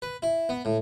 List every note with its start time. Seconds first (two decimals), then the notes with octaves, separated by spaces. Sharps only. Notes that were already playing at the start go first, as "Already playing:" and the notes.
0.02 B4
0.22 E4
0.49 B3
0.65 A2